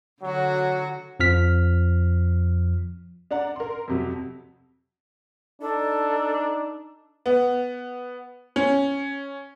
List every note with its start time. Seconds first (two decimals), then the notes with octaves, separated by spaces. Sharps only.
0.22 D3 F#3 F#4
1.20 F2 F3 F6 B6
3.31 D4 D5 F#5 A#5
3.56 A#4 C6
3.88 F2 C3 F#3
5.62 D4 D#4 A4
7.26 B3
8.56 C#4